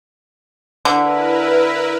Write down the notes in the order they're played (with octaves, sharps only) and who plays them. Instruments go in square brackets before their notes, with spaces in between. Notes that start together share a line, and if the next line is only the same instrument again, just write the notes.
[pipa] D3 [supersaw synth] E4 A#4 B4